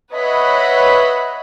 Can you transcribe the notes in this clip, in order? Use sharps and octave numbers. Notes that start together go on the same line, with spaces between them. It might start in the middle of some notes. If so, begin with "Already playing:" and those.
B4 C#5 D#5 E5 F#5 B5